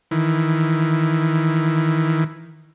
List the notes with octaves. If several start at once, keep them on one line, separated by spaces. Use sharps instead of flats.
D#3 E3